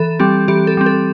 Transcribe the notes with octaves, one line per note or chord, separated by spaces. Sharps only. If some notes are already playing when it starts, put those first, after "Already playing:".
Already playing: E3 A4
G3 C4 G4
E3 G4
A4
G3 C4
A4